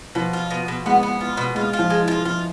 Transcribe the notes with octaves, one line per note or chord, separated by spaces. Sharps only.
B2 F3
F4
B2
B2
G#3 B3
B3
F4
B2
G#3 F4
F4
F3
G#3
E3
F4
F3 F4